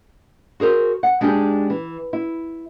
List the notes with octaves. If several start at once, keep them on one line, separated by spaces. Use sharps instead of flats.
F#4 G#4 A#4 C5
F#5
G#3 D4 D#4 G4 G#4
E3
E4